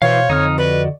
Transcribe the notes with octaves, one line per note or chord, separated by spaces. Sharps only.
B2 E3 C5 C#5 F5
F2 D3 D#4 D#6 F6
F#4 B4 D5 D#5